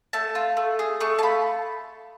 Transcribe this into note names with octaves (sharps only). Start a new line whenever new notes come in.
A3 A5
F4
A3
G#4
A3 C#6
A5
F4 B5